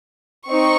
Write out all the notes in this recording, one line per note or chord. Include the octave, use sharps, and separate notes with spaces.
C4 D#4 C#6